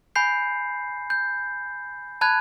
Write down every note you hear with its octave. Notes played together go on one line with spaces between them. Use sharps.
G#5 B5 G6 C7
G6
A5 B5 F#6 G#6